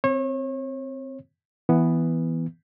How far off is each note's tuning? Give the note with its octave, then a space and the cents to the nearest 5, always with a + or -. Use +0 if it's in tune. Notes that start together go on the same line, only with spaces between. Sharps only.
C4 +0 C#5 -35
E3 -5 B3 +0